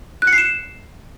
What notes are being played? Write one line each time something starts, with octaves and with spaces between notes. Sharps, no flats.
F#6
C#7
C7
E7